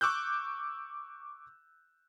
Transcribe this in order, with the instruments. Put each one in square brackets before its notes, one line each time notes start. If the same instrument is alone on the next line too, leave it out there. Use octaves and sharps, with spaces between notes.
[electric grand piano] C#6 D6 E6 F#6 G6